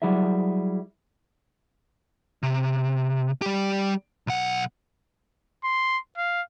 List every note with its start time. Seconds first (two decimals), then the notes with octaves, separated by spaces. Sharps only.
0.02 F#3 G3 E4 G#4 E5
2.43 C3
3.42 G3 G4
4.27 B1 F#5
5.64 C6
6.17 F5